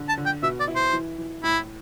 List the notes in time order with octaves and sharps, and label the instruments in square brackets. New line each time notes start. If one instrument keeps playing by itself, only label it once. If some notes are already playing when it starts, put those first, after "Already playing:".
Already playing: [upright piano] D3
[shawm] A5
[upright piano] D3
[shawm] G5
[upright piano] B2 [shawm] E5
[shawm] D5
[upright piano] E4
[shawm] C5
[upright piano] E3
E3
[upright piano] A2 [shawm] E4